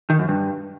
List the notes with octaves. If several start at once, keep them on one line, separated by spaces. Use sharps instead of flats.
D#3
F#2
G2